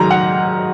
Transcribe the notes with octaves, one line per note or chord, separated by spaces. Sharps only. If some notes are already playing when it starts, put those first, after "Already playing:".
Already playing: G#2 D#3 F#3 A#5
F#5